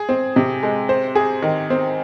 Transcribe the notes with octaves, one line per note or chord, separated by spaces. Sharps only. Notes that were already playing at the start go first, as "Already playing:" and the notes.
Already playing: G#4
C4
C3
G#3
C5
G#4
D#3
C4